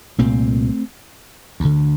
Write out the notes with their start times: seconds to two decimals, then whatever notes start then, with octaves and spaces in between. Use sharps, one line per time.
0.19 C2 A#2 A3 C4
1.60 D2 D3